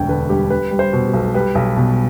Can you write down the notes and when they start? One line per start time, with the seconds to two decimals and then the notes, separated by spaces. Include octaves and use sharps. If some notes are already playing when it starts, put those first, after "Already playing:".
Already playing: E1 D2 G5
0.09 D3 B4
0.29 G3 G4
0.50 G3 B4
0.71 G3
0.79 C5
0.93 B2
1.07 G4
1.13 B1
1.34 G3 B4
1.55 B1
1.77 B2